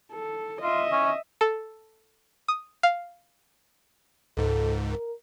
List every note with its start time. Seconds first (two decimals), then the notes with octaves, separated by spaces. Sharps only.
0.12 A4
0.61 F4 D#5 E5
0.92 C#4
1.41 A4
2.48 D#6
2.83 F5
4.37 C#2 G#2 A4
4.90 A#4